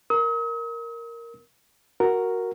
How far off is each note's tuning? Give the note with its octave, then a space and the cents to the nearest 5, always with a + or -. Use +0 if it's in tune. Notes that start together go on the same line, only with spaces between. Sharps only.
A#4 +0 D#6 +45
F#4 +0 A#4 +0